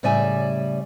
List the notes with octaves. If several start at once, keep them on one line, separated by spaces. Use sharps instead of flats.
A2 C#3 G3 D5 E5 G#5